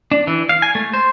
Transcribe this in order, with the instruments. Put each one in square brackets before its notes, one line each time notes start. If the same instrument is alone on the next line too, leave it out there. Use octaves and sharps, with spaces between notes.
[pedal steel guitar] D4
E3
F5
G#5
A3
C5